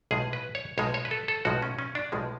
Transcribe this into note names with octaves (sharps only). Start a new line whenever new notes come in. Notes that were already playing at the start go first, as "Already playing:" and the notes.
B1 A2 F3 G#3 G#4
B4
C#5
B1 A2 F3 G#3 C#5
C#5
B4
A4
A4
B1 A2 F3 G#3 F#4
C#4
C#4
D4
B1 A2 F3 G#3